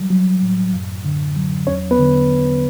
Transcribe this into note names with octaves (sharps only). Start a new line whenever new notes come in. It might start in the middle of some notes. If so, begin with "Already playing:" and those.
Already playing: E3 F#3 G3
F#3
A2
F#2
D3
F#3
E2 C#4 C#5
B3 B4
D3